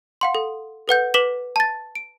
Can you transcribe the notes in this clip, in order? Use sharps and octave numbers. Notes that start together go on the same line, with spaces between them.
F5 F#5 C6
A4
A4 B4 F#5 G6
B4 D6 B6 E7 F#7
A5 A6
D7